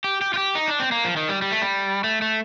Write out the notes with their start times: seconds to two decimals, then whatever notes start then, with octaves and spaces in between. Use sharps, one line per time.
0.04 G4
0.21 G4
0.34 F4
0.37 G4
0.55 D#4
0.68 D4
0.80 C4
0.92 A#3
1.05 F3
1.16 D#3
1.29 G3
1.42 G3
1.52 A3
1.62 G3
2.04 A3
2.22 A3